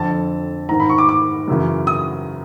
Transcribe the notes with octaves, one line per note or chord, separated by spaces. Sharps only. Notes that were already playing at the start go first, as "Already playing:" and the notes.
Already playing: F2 D3 A5
G#2 D#3 A#5
B5
C#6
D6
D6
F#2 C#3 E3
D#6